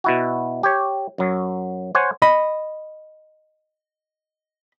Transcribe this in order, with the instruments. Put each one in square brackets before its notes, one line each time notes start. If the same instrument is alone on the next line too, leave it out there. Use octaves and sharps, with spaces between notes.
[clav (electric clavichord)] B2 E4 F#4
G4 C#5
F#2 F#3
C5 C#5 F#5 G#5
[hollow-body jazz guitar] D#5 B5